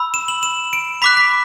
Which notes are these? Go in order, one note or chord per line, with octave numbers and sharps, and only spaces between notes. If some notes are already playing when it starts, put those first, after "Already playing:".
Already playing: B5 E6
E7
F#7
E7
D7
B5 D6 F#6 B6
B6